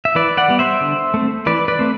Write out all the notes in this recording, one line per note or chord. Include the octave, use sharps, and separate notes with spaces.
E5
E3 B4 D5
D5 F#5
G3 B3
C5 E5
D3
A3 C4
E3 B4 D5
B4 D5
A3 C4